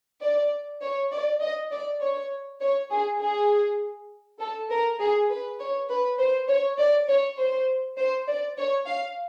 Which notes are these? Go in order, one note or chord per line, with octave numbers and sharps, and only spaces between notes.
D5
C#5
D5
D#5
D5
C#5
C#5
G#4
G#4
A4
A#4
G#4
B4
C#5
B4
C5
C#5
D5
C#5
C5
C5
D5
C#5
F5